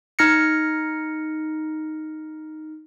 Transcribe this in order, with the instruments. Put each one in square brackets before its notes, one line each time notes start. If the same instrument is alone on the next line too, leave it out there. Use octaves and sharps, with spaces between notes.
[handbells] D#4 F6 A#6 C#7